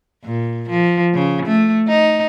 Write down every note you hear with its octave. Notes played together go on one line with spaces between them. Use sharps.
A#2
F3
C#3
A3
D#4